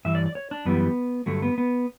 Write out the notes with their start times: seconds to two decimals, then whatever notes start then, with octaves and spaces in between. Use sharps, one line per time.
0.05 G2 E3 E5
0.15 D5
0.26 D5
0.35 C#5
0.51 D4
0.65 F#2 E3 G3 B3
1.26 G2 D3 F#3 A3
1.42 B3
1.58 B3